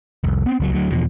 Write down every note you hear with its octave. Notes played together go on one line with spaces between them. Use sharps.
F1 C2
B3 C4
C#2 F3 F#3
D2 F#3
E2 B2 F3